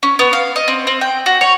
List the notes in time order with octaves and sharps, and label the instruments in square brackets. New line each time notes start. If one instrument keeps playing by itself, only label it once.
[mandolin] C#4
B3
F5
D#5
C4
C4
G5
F#4
C#5